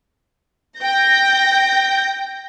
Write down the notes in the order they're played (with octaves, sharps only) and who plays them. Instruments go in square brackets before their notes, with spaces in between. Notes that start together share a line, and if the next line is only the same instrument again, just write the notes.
[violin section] G5 G6 A#6